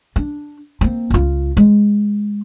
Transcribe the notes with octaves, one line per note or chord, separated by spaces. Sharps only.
D4
A#3 C4
C#2 F4
G#3